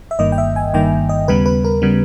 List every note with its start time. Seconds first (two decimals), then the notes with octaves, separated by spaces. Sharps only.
0.11 E5
0.19 G1 G2 D#3 A#3 D#5
0.32 G5
0.38 E5
0.56 G#5
0.74 G1 G2 D#3 A#3 G5
1.09 D#5
1.28 D#2 C#3 G3 B3 B4
1.46 B4
1.64 A#4
1.82 C#3 G3 B3